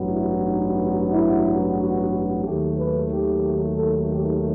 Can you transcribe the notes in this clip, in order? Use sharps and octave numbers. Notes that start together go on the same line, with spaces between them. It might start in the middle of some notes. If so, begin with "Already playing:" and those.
Already playing: A1 G2 F#3 B3
E4
D#4
E4
F#4
D#2 D#3 F#3 A3 G4
B4
G4
A4
G4